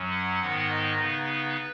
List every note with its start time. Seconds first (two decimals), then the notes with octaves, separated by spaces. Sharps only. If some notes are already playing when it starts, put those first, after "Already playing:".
Already playing: F#2 F#3 C#4
0.11 F#5
0.40 G#2 D#3 B3 D#4
0.69 D#5
0.98 C#3 B3 D#4 B4